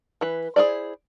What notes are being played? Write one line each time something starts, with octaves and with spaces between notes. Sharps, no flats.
E3 B4
E4 G#4 B4 C5 D5